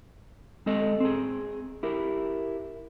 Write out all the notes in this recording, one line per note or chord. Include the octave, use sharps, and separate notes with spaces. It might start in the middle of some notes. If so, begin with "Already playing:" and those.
G#3 C4 A4 D#5
C4 G#4
E4 G4 A#4